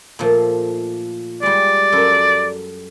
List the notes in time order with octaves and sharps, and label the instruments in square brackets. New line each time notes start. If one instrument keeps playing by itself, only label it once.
[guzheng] A#2 F3 A3
[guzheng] G3 G#3 [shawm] D5
[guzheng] F#2 A4